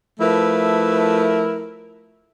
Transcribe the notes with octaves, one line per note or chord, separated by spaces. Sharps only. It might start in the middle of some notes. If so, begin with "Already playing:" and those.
F3 A3 E4 A#4 B4